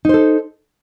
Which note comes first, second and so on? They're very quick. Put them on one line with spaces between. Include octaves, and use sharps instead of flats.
D#4 C5 A4